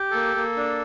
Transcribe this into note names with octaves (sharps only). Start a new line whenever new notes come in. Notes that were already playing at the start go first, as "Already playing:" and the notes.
Already playing: G4
A#3 A4
A#3
D4